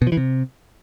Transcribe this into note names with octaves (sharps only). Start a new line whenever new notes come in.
B2
F3
E3
C3